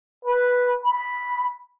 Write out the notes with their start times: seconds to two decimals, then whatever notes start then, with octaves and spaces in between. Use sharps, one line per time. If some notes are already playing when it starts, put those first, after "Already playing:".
0.25 B4
0.83 B5